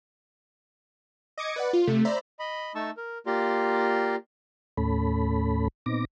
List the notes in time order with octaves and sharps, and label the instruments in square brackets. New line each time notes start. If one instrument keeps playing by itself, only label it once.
[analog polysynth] D#5 D6 D#6 G#6 C#7
B4 D5 F#5
F4
C3 A3
C5 D5 E5 A#5 B5
[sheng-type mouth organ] D#5 B5
A3 D#4 A5 C#6 E6
A#4
A#3 F4 G4 D5 A#5 C6
[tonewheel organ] D#2 A2 A3 C#4 A4 B5
A#2 B3 C4 D#4 D6 A#6